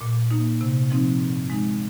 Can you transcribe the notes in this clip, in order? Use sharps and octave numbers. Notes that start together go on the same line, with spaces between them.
A#2
A#3 D#4
C3
F3 C4 D#4
G#2
G#3 D#4